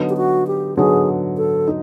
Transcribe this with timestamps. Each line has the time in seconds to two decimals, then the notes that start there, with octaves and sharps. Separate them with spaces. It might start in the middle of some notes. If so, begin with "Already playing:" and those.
Already playing: D3 F#3 B3 D#4
0.09 G4
0.17 F#4
0.47 G4
0.77 D3 F#3 B3 D#4 G#4
1.37 A4
1.68 D#4